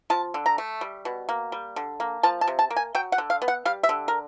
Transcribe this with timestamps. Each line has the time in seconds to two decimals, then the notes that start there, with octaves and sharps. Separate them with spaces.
0.10 F3 A5
0.34 D3
0.46 A#5
0.58 A3
0.81 G3
1.05 B2
1.29 A#3
1.52 G3
1.76 D3
2.00 A#3
2.23 F3 A5
2.41 A5
2.48 C3
2.59 A5
2.70 A#3
2.76 G#5
2.95 F#3 G5
3.12 F#5
3.18 D3
3.30 F5
3.42 B3
3.48 F#5
3.65 G3 F5
3.83 E5
3.89 D3
4.08 A#4